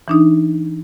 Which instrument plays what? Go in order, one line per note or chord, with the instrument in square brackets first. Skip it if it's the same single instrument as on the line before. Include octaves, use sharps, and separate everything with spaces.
[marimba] E3 D4 D#4